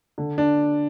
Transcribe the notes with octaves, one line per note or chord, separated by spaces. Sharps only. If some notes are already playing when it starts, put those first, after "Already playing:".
D3
D4